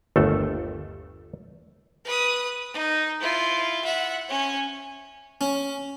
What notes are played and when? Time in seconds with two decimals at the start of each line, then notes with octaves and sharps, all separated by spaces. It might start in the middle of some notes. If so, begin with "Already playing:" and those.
0.16 G1 D#2 A3 A4
2.05 B4 D#6
2.74 D#4
3.20 E4 F4
3.85 E5 F#5
4.29 C#4 C#5
5.41 C#4